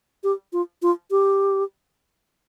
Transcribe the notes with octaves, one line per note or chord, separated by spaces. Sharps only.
G4
F4
F4
G4